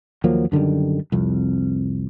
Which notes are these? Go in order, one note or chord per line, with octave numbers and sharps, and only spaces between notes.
D#2 F3 F#3 A#3
F#2 D3 D#3 G3
C2 F2